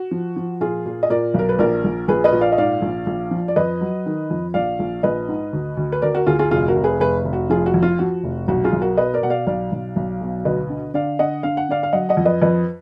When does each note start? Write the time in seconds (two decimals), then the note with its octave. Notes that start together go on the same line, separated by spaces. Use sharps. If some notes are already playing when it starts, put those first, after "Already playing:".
Already playing: F#4
0.11 F3
0.36 F3
0.60 A#2 F4 G#4
0.86 A#2
1.03 D#5
1.10 A#2 A#4 D5
1.34 B1 A#4
1.49 B4
1.59 A#1 A#4 D5
1.84 A#1
2.08 A#1 G#4 B4
2.24 B4 D#5
2.32 A#2
2.41 D5 F5
2.52 D#5
2.58 G#2 D5 F5
2.82 A#1
3.06 A#1
3.31 F3
3.48 D5
3.56 F2 B4 D#5
3.81 F#3
4.06 D#3
4.31 F2
4.54 A#1 D5 F5
4.79 A#1
5.03 A#1 B4 D#5
5.28 G#2
5.53 D2
5.77 D2
5.92 B4
6.02 D2 A#4 D5
6.15 F#4 A#4
6.27 D2 F4 G#4
6.39 F4 G#4
6.51 F1 F4 G#4
6.68 F#4 A#4
6.76 F1
6.84 G#4 B4
7.00 F1 G#4 B4
7.25 F1
7.33 F#4
7.50 F3 F4 G#4
7.66 F#4
7.74 F2
7.83 F4
7.99 F3 F#4
8.24 F1
8.48 B1 F#4
8.64 F4 G#4
8.73 B1
8.81 F#4 A#4
8.97 B2 B4 D#5
9.14 A#4 D5
9.23 B2 F#5
9.30 D5 F5
9.47 B1 D5 F5
9.72 B1
9.96 B1
10.21 B2
10.45 D2 B4 D#5
10.69 D3
10.94 D3 D5 F5
11.19 D3 D#5 F#5
11.43 D3 F5
11.57 F#5
11.69 D3 D5 F5
11.83 F5
11.93 F#3 D#5 F#5
12.09 D#5 F#5
12.17 F2
12.25 B4 D#5
12.42 F2 B4 D#5